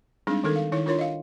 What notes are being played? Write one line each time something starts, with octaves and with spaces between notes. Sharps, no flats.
G3 G#3 C4 D4 D#4 G#4
D#3 D#4 A4 A#4
F5
D#3 D#4 E4 C#5
D4 F4 A#4 C#5 C6
D#5 F5